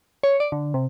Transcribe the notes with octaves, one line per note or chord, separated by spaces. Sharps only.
C#5
D5
D3
C3